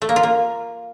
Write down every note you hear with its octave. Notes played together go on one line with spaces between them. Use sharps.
A3
A#3
F4
A#3